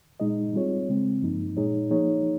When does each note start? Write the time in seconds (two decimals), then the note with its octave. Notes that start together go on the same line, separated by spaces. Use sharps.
0.20 A#2 G#3 D#4 G#4 D#5
0.54 G3 C4 F4 G#4 C#5
0.89 C#3 G#3 C4
1.22 G2 F3 A#3 D#4
1.57 A#2 G#3 D#4 G#4 C#5
1.90 F3 A#3 D#4 G#4 C#5